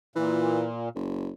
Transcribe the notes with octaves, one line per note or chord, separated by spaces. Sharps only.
A#2 E3
F#1